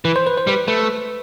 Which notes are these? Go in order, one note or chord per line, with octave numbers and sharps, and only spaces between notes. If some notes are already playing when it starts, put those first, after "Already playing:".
E3 B4
C5
B4
C5
G3 B4
A3 B4